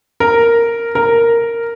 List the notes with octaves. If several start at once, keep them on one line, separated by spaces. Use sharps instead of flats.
A#4
A#4